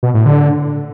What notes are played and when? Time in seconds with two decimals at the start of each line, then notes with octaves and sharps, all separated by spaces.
0.03 B2
0.14 A2
0.26 D3